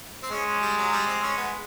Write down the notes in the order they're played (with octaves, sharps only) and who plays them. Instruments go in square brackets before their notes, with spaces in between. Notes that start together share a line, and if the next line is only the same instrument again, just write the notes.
[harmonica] C4
[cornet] G#3 [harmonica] C#4
[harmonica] C#4
G3
F#3
G3
C4
C#4
B3